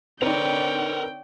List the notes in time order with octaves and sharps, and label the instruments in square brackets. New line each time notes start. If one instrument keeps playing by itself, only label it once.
[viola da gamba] D3 C#5 D5 [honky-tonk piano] C4 D#4 [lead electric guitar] A#4 B4 [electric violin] G5